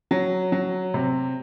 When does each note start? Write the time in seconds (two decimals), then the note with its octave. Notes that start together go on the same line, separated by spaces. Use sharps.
0.11 F#3
0.52 F#3
0.94 C3